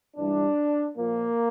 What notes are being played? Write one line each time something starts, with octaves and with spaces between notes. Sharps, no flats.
G2 E3 G3 D4
A#2 F3 A#3